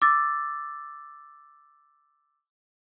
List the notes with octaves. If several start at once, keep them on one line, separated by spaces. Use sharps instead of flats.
D6 E6 A6